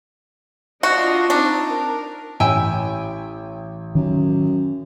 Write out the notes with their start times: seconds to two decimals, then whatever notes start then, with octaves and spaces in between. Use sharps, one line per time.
0.83 D4 F4 F#4 D#5
1.30 C4 D4 D#4
1.69 A#4
2.40 A1 E4 G5 G#5
3.95 F#2 D#3